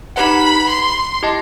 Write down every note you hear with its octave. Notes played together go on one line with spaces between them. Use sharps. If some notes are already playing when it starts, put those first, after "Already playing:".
D#4 G4 B4 F#5 B5
C6
E4 G4 D#5 A5